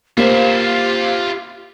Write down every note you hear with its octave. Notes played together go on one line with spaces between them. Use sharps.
A#3 F4 G4 C5 E5